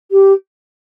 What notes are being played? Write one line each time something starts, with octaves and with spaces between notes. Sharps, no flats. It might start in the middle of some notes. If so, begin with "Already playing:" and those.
G4